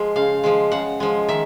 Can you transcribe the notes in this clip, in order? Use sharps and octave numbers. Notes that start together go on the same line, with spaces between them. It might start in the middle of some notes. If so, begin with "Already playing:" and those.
Already playing: F3 G#3
C#3 F5
F3 G#3
C#3 F#5
F3 G#3
D#3 E5